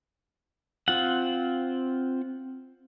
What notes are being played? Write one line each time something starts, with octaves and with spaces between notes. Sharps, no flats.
C4 F4 F#5